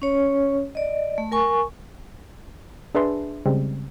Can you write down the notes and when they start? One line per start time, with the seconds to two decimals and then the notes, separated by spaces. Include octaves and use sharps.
0.02 C#4 C#5
0.75 D5 D#5
1.18 A3
1.32 A#4 G#5 C#6
2.95 D4 G#4 B4 E5 A5 C6
3.46 C#3 G3 G#3 C4